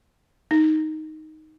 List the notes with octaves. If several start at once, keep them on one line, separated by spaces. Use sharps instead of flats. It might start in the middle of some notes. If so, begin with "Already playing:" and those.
D#4